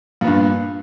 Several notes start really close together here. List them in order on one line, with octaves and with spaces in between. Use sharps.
A#2 B3 G2